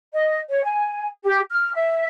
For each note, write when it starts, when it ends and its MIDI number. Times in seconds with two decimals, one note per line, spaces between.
0.14 0.38 75
0.50 0.60 73
0.63 1.06 80
1.24 1.40 67
1.50 1.73 89
1.74 2.06 76